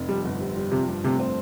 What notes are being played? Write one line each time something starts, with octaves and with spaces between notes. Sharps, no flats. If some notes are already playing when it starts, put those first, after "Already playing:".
Already playing: F1
F2 G3
G1
C3
G3
C3 F3
G2
C3 A3
C4